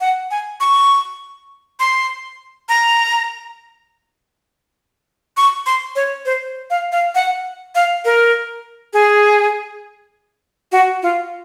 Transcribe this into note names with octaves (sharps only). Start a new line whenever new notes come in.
F#5
G#5
C#6
C6
A#5
C#6
C6
C#5
C5
F5
F5
F#5
F5
A#4
G#4
F#4
F4